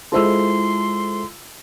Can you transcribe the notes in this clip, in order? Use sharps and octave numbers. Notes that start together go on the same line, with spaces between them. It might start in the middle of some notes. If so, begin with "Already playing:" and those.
G#3 E4 F4 A4 C5 C6 E6